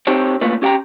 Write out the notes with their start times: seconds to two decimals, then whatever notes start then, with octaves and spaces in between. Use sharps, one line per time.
0.07 C4 D#4 G4 A4 C5 C#5
0.41 A3 A#3 C#4 F4 B4
0.62 C#4 G4 F#5 G5 A#5